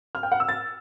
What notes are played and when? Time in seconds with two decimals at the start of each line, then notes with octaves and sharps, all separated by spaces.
0.15 F6
0.23 G5
0.32 F#5
0.40 E6
0.49 A6